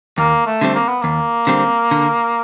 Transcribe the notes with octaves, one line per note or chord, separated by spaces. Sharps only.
D#2 A#3
A3
D3 G3 C4
A#3
B3
D#2 A#3
D3 G3 C4
D3